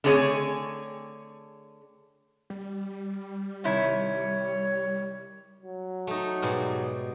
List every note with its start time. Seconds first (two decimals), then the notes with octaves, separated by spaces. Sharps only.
0.04 D3 A3 C4 G#4 C#5 G#5
2.50 G3
3.64 C3 D#3 E4 C#5
5.63 F#3
6.07 A3 D#4
6.42 G#2 B2 G3